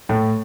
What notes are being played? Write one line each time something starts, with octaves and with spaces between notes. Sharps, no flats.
A2 A3